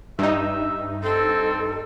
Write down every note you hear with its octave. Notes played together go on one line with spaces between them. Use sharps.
G2 D#4 E5
C4 A4